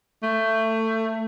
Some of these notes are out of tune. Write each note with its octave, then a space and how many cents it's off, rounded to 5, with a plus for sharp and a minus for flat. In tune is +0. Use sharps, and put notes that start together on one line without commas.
A3 +20